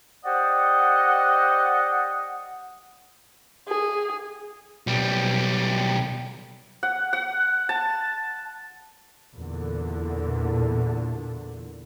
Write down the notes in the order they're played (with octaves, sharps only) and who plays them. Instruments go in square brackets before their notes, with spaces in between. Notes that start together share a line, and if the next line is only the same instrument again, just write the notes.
[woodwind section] G4 C5 D5 D#5 F#5
[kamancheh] G#4
[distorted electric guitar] B1 G3
[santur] F#5
F#5
A5
[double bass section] E2 A#2 D3